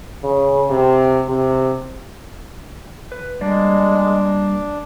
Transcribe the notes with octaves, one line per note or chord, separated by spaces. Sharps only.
C#3
C3
C3
B4
G3 G#3 A#3 D4 D5